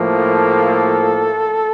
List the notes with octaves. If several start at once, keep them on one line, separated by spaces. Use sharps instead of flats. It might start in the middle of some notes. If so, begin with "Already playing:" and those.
Already playing: A2 F3 A#3
A4